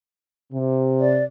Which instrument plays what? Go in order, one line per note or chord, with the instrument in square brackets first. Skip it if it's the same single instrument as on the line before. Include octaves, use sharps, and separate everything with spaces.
[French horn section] C3
[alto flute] D5